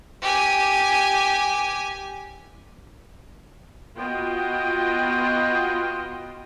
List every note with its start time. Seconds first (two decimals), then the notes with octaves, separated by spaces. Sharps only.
0.21 G4 G#5
3.96 B3 F4 F#4 D#5 G5